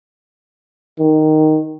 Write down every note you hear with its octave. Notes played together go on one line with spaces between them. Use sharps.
D#3